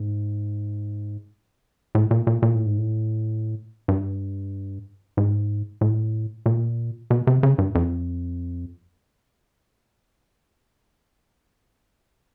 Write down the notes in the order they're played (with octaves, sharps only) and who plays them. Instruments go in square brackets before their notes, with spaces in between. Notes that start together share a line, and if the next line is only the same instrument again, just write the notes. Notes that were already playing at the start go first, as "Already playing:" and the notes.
Already playing: [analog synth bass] G#2
A2
A#2
A#2
A#2
A2
G#2
A2
G2
G#2
A2
A#2
B2
C3
C#3
G2
F2